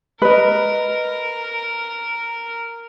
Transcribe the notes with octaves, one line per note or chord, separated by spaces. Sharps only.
A#4 B4 D#5